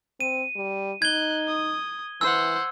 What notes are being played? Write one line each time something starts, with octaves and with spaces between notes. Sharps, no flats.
C4 D#7
G3
D#4 F#6 G#6 G7
D#6
E3 C5 F#5 E6